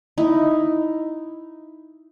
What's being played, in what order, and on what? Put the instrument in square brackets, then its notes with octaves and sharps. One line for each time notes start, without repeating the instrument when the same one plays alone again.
[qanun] D#4 E4